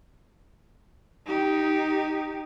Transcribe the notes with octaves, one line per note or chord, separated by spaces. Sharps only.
D#4 G4